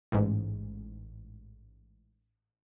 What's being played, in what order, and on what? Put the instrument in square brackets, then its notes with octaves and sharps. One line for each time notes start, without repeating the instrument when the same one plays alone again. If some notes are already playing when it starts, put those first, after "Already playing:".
[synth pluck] A1 G#2